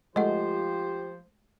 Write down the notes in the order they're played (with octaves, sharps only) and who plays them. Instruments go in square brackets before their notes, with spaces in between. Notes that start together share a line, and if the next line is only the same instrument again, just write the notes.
[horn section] F3 C5 [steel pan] G#3 A3 [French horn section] F4 G4 [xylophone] D#5 F#5